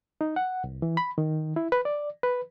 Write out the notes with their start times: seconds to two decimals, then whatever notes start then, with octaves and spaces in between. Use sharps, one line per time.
0.21 D#4
0.36 F#5
0.64 C2
0.82 E3
0.97 B5
1.18 D#3
1.56 E4
1.72 B4
1.85 D5
2.23 B4